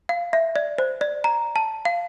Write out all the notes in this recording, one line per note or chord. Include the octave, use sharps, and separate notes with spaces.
F5
E5
D5
C5
D5
A#5
A5
F5